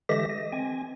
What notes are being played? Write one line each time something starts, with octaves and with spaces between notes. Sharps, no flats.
D3 E3 G#3 G4 E5 A#6
D#5
C4 G#5